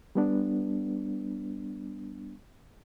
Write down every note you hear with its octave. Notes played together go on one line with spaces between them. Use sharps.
G3 B3 D4